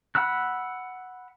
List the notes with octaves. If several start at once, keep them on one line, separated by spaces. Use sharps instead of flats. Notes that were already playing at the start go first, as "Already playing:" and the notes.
F#5 B5 E6 F#6